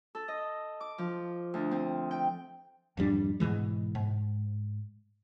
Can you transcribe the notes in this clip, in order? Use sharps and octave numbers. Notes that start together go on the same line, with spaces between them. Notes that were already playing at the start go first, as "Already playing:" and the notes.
A4
D#5
D6
F3
D2
C4
G5
G#1 F2 G3 D4
G#2 B2 E3 G#3
G#2